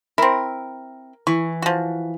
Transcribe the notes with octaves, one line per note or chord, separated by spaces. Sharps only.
C4 E4 A#4
E3 C#6
F3 F#4